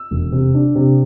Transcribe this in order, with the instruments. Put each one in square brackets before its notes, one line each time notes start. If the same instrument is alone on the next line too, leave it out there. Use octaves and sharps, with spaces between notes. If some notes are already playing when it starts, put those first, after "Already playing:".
Already playing: [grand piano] E6
E1
C3
D4
C3